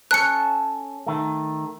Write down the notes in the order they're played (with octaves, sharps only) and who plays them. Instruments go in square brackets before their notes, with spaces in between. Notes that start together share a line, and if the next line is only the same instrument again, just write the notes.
[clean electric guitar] C#4 A4 [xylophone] F#6 C#7
[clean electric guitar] D#3 A3